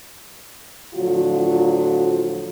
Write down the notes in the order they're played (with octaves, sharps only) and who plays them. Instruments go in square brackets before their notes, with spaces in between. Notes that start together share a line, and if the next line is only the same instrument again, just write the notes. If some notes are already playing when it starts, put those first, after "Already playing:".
[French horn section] A2 D3 F3 F#3 F4 F#4